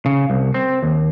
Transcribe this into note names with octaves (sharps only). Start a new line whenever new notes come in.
C#3
C2
C4
D#2